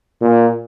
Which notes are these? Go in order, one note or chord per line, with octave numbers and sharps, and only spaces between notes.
A#2